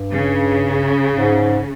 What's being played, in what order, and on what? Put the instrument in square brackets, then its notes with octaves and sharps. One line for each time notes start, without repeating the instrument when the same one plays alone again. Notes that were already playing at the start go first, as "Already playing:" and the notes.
Already playing: [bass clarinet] G2
[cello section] C#3
[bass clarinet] G#2